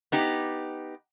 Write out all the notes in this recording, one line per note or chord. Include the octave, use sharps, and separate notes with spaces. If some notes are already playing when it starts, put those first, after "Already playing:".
B3 D#4 G4